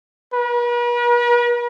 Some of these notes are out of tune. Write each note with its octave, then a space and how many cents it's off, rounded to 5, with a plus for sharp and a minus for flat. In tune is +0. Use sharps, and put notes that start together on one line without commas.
B4 -45